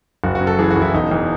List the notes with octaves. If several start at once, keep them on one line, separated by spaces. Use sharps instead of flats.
F#1 F#4
F#4
F#2
A4
E3 G#4
F#4
F#1
E4
E1 D#4
E2